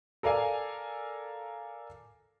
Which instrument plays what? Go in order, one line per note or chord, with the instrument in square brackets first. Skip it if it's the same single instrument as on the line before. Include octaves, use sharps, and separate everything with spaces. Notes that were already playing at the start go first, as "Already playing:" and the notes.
[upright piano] A4 A#4 D5 F5 G#5